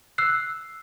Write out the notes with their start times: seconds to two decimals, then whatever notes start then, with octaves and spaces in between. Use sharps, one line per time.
0.18 E6 F#6 C7